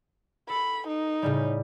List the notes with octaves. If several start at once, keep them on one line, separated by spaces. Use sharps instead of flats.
A4 B5
D#4
A2 C#3 G3